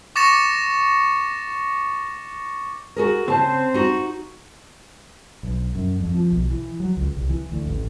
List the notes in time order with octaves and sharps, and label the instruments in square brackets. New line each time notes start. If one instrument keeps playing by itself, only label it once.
[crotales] C#6 D6 A6 A#6 C#7 E7
[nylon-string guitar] F#4 G#4 A#4
[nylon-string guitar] C#3 A5 [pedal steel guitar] C4 C5
[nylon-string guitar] D#4 F#4
[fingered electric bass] B1
F#2
F2
F3
B1
E3
F#3
C#2
C2
E3
D2
A1